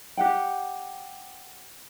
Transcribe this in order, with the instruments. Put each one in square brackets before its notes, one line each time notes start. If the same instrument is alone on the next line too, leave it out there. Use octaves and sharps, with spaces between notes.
[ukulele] G4 F#5 G5